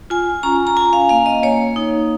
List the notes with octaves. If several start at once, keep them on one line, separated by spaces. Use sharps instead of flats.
F4 G#5
C#4 A#5
A#5
C#4 G#5
F5
A#3 F5
D#5
A#3 C#5
D#4